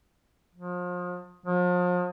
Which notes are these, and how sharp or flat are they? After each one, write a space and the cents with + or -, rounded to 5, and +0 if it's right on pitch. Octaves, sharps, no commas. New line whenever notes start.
F3 +35
F3 +40